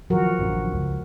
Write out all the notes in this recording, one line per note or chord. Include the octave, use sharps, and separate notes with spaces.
D#3 F3 F#3 F#4 A#4
A1 F#2 D3
C#2